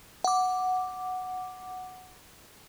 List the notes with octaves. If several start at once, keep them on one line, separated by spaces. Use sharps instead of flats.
F#5 D6